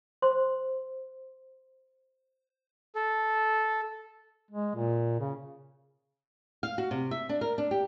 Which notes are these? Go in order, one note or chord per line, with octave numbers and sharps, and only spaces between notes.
C5 C6
A4
G#3
A#2
C#3
F5
F#4
C3
E5
D4
A#4
D4
G4